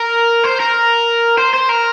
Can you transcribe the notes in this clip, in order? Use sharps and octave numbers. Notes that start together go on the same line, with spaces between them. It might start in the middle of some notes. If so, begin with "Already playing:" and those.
Already playing: A#4
C5
A#4
C5
C5
A#4